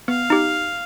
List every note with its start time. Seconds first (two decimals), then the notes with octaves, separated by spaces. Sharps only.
0.08 B3 F5
0.30 D#4 G4